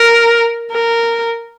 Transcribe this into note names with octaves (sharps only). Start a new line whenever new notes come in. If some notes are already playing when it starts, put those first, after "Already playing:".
Already playing: A#4
A#4